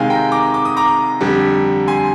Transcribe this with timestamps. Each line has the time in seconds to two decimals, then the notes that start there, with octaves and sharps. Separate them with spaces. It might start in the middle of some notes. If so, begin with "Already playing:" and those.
Already playing: C3 D#3 G#3 F5 G#5
0.10 G5 A#5
0.31 A#5 D6
0.54 D6
0.65 D#6
0.77 A#5 D6
1.21 F2 D3 G3
1.88 G#5 C6